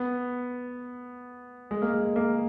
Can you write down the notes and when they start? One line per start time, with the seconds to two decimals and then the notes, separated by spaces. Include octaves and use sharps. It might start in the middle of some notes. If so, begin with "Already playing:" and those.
Already playing: B3
1.71 G#3
1.82 A#3
1.93 G#3
2.16 A#3